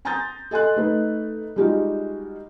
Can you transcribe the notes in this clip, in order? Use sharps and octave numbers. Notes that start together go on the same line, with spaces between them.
G#5 A#5 C6 D#6 G6 A6
A4 D#5 G#5 C6 F#6
A3 D#4 B4
G3 G#3 D#4 F4 F#4